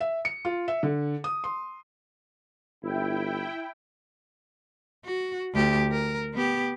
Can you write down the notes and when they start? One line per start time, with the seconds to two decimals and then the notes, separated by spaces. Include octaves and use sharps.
0.01 E5
0.25 C#7
0.45 F4
0.68 E5
0.83 D3
1.24 D#6
1.44 C6
2.83 G1 E4 G5
5.05 F#4
5.54 D2 G4
5.92 A#4
6.34 B3 G4